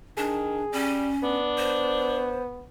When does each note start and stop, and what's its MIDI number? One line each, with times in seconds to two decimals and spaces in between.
0.17 0.64 51
0.17 0.65 62
0.17 1.03 68
0.72 1.10 55
0.72 1.37 61
1.23 2.68 59
1.23 2.37 62
1.58 2.42 72